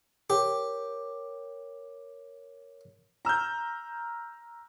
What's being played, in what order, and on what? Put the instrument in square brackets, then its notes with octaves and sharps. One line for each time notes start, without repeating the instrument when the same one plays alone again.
[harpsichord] G4 [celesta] A#4 C#5
[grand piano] A#5 E6 F6 G6